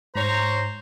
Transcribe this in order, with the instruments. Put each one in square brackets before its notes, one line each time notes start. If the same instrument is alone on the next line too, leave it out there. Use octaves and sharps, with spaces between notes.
[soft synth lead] G#2 [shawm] C5 [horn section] C#5 A#5